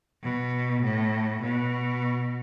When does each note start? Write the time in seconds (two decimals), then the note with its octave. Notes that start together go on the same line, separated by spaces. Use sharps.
0.23 B2
0.83 A2
1.43 B2